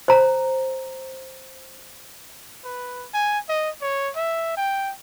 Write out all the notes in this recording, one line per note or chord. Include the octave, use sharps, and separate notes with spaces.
C5 A#5
B4
G#5
D#5
C#5
E5
G5